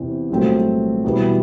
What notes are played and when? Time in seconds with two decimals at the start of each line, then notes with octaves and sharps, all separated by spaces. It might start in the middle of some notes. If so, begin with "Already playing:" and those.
Already playing: E2 C3 E3
0.30 C2 A#2 F#3 A3 C4
1.04 E2 B2 G3 B3 E4